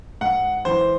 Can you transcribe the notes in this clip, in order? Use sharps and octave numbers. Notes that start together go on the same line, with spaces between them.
G#2 F#5
E3 C5